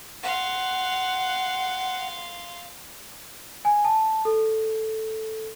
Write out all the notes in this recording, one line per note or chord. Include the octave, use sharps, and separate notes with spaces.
F5 F#5 C6
G#5
A5
A4